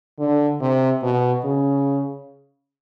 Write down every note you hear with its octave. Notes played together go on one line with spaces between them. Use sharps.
D3
C3
B2
C#3